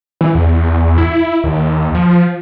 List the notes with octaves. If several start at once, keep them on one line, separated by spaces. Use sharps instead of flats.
E3
E2
E4
D#2
F3